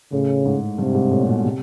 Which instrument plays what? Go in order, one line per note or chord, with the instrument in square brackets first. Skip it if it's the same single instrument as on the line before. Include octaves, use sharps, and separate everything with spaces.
[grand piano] A2 [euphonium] C#3
[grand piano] G#2
[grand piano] G2 [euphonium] C3
[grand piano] G#2
A2
A#2
B2
C3